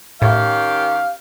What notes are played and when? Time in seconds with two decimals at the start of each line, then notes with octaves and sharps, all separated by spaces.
0.22 A2 D#3 C#4 G4 F5